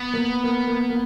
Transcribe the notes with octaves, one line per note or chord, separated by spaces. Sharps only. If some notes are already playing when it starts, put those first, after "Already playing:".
Already playing: B3
A#3
A#3
A#3
A#3